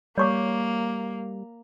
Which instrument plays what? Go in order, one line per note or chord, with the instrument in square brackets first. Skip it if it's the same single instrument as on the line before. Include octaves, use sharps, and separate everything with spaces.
[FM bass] G3 [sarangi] A#3 [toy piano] C#5 C#6 D6